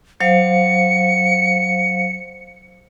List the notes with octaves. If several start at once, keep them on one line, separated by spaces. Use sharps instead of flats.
F#3 C5 F5 C#7